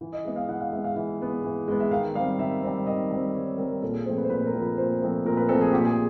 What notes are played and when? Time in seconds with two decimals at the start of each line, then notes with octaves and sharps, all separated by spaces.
0.01 E3
0.13 D#5
0.25 G#3 B3 E5
0.36 F5
0.48 E3 F#5
0.61 F5
0.72 G#3 E5
0.76 B3
0.84 F5
0.96 E3 E5
1.20 G#3 B3
1.44 E3
1.68 G#3 B3
1.80 E5
1.91 D#3 F5
2.15 G3 F5
2.19 C4
2.39 D#3 E5
2.63 G3 C4
2.86 D#3 D#5
3.11 G3 C4
3.35 D#3 C#5
3.58 G3 C4 A#4
3.82 A#2 A4
3.94 G#4
4.05 F3 A3 C4 C5
4.18 B4
4.24 C5
4.30 A#2 B4
4.46 A#4
4.54 F3 A3 C4
4.62 B4
4.77 A#2 C5
5.01 F3 A3 C4
5.25 A#2 A#4
5.37 B4
5.48 F3 A3 C4 A4
5.61 G#4
5.73 A#2 G4
5.85 G#4